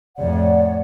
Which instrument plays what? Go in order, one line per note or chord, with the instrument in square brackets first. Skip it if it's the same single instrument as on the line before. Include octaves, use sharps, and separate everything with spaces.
[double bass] F2 A2 [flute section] C#5 D5 F#5